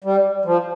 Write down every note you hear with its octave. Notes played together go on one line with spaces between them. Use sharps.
G3
F3